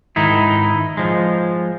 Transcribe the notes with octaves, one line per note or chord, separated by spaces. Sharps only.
G#2 D#3 D#4 E4
F3 G#3